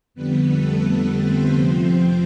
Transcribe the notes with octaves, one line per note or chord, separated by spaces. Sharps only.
F2 D3 G3 B3 B4
A3 A4
C4 C5
F2 C3 F3